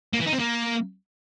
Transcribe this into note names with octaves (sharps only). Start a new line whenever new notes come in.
A#3
E3
D#4
C4
A#3